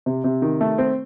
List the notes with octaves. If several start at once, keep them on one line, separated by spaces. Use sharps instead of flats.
C3
C3
D#3
A3
C4